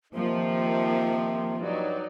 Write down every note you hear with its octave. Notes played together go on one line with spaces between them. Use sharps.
C3 D#3 F3 A#3
G2 F#3 D#4 D5